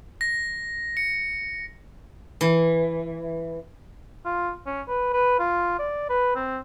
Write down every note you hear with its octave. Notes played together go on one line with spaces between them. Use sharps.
A#6
C#7
E3
F4
C#4
B4
B4
F4
D5
B4
C4